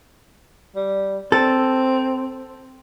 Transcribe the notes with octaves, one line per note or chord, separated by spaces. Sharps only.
G3
C4 A4